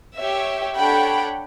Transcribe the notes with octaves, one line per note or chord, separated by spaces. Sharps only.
G4 C#5 E5
D4 A4 C#5 F#5 G5 B5